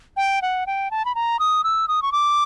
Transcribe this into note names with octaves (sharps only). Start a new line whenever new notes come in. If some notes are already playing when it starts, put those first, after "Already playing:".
G5
F#5
G5
A5
B5
A#5
D#6
E6
D#6
C#6
D6